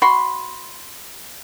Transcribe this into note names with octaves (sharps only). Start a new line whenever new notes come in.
F#4 B5 C6